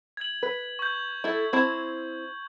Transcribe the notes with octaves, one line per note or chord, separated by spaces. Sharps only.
G#6 F#7
B4
C#6 G6
E4 A4
C4 E4 A5